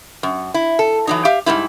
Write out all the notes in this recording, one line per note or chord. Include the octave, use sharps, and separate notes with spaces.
F#2
E4
A4
E3 F#3 D#4
G4 E5 F5
G#2 C#3 G3 E4